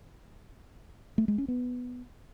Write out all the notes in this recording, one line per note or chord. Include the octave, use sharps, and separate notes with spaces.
A3
G#3
C#4
B3